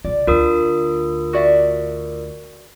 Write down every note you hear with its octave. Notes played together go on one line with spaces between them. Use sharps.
C#3 F4 D5
D2 D4 F4 A#4 D#6
F#4 D5 E5